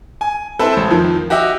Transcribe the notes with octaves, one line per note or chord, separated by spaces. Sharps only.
G#5
C4 E4 A4 B4
A1 C5
F2 D#3 F3
F#4 G4 D#5 E5